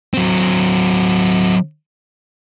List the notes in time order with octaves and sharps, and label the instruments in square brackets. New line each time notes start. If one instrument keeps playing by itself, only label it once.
[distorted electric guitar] F#3 C4